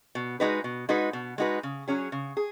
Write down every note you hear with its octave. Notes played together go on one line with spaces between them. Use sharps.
B2
G#3 D#4 F#4 B4
B2
G#3 D#4 F#4 B4
B2
G#3 D#4 F#4 B4
C#3
F#3 C#4 G#4
C#3
G#4